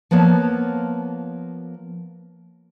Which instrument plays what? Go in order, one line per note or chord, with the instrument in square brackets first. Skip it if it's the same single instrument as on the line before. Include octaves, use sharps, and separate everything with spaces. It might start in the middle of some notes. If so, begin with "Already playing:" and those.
[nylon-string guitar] F3 A#3 B3 C#5 A5